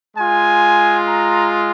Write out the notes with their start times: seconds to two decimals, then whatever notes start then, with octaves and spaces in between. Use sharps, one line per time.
0.17 G#3 F4 G#5
1.06 A#5